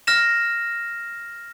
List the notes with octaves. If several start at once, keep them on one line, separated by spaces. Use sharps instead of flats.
F6 A#6 E7